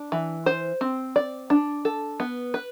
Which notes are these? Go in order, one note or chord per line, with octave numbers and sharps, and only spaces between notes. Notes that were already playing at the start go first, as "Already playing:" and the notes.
Already playing: D4
E3
C5
C4
D5
D4
A4
B3
B4